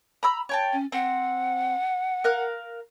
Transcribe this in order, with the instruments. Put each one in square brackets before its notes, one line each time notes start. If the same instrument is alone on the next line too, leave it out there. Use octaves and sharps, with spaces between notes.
[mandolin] A#5 B5 E6
C#5 G5 A5
[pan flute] C#4
[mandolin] C4 [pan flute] F#5
[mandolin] A#4 F5 F#6